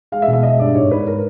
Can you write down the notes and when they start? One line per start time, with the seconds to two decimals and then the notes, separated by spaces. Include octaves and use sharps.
0.12 G#3 F5
0.22 E5
0.28 B2
0.33 E5
0.43 G#3 D#5
0.59 G2 D5
0.75 G#2 C#5
0.91 G#2 B4
1.07 A#4